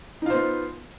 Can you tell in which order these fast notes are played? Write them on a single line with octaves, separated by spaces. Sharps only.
D#4 F4 C5 B3